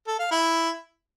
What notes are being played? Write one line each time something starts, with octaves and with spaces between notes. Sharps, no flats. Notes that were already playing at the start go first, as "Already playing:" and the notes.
A4
F5
E4